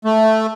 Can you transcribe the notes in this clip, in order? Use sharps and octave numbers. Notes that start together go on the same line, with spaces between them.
A3